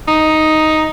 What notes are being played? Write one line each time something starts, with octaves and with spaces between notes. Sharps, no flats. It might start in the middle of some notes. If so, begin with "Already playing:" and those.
D#4